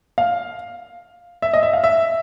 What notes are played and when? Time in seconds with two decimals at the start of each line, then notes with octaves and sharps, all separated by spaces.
0.18 F5
1.42 E5
1.53 D#5
1.63 E5
1.73 F5
1.84 E5